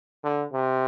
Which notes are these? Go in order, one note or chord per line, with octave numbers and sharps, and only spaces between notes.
D3
C3